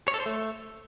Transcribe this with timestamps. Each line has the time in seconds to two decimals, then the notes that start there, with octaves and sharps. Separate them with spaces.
0.08 C#5
0.14 A4
0.20 C5
0.26 A3